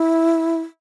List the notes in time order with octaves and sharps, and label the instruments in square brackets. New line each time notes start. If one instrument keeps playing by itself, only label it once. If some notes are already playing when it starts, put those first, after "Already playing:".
Already playing: [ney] E4